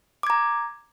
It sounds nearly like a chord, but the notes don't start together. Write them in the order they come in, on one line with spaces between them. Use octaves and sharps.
D6 G#6 A#5